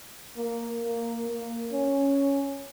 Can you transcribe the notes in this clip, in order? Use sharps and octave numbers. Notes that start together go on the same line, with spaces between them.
A#3
A#3
A#3
C#4